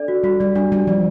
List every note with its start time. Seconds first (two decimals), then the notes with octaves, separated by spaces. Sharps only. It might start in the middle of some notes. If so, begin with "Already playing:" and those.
Already playing: D4 A4 D5
0.08 F#4
0.24 G3 F#4
0.40 G3 D5
0.56 G3 D4
0.72 G3 D4
0.87 F3 D5